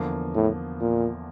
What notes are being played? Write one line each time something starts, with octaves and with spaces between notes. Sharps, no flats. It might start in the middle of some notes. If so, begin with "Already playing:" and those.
Already playing: E2 D3 F3 A#3
A2
A#2